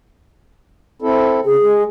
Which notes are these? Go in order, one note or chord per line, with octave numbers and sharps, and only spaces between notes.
C4 E4 A4
C#3 G#4
G#3